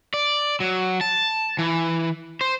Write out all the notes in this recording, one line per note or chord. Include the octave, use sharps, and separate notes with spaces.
D5
F#3
A5
E3
C5